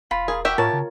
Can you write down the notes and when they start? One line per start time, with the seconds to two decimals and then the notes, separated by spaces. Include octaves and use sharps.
0.11 E1 F4 B5
0.28 G#4 A#4
0.45 F#4 G4 E5 G5
0.58 A2 F4 A#4 C#5 A5
0.73 C#3